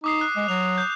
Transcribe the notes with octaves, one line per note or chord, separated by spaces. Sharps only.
D#4 D6 D#6 C7
F#6
G#3
F#3 F7
G6